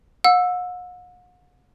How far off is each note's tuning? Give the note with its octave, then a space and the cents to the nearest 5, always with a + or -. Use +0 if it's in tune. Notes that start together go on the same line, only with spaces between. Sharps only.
F#5 -45 E6 +0